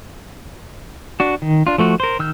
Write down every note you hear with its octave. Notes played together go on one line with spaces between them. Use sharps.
D4 F#4
D#3
D4 F4
F3 A3 F#4
A#4 C5
D#3 E6 F6 G6